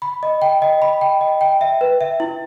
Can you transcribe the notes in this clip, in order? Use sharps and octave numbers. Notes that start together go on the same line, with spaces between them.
B5
D#5
G5
D#5
B5
G5
D#5
G5
E5
B4
E5
E4